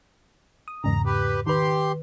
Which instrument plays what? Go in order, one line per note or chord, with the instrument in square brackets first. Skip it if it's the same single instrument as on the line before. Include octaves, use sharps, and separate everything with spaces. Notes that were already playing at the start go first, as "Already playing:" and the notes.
[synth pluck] D#6
[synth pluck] E2 G#2 C#3 [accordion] A#5
[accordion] G4 B4
[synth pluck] D#3 B4 [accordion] G4 C6